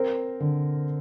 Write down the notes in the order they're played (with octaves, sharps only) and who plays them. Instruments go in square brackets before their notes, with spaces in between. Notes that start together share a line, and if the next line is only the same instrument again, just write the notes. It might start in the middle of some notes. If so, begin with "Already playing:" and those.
Already playing: [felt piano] C4 A#4
D3